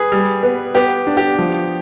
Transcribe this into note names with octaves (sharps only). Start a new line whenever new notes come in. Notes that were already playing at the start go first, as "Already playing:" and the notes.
Already playing: G#4 B4
G3
B3
B3 G4
D4
G4
F3